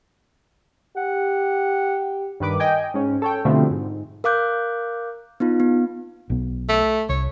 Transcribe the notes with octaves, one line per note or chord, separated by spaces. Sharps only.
G4 F#5
G2 D#3 B4 D6
D#5 G5 G#5
G#2 C#4
A4 C#5 G5
B2 D3 F3 G3 A3 C4
G#2
A#4 F5 D6 F#6 G6
B3 D#4 F4
B3
B1 B2 B3
A3
C2 C#5